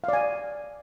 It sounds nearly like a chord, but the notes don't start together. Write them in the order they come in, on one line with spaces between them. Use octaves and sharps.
F5 D5 G#5